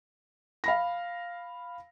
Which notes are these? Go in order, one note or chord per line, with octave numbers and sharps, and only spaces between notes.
F5 B5 A#6